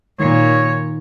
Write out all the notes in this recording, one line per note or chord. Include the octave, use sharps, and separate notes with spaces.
A#2 D#3 C#5